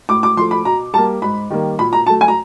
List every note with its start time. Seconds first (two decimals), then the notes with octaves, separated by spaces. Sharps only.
0.09 A2 D6
0.23 D6
0.37 F3 C6
0.41 A3
0.51 B5
0.65 B2 A#5
0.94 G3 A5
0.98 A#3
1.22 G#2 B5
1.50 D#3 G3 A#3
1.78 A#2 B5
1.93 A#5
2.07 F#3 A3 A5
2.21 G#5
2.28 A#5